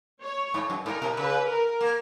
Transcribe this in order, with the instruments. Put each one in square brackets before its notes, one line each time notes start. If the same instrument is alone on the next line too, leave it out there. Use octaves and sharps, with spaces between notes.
[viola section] C#5
[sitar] G#2
F#2
[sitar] G#2 [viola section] A#4
[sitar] B2
[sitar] C#3 [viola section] B4
[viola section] A#4
[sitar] A#3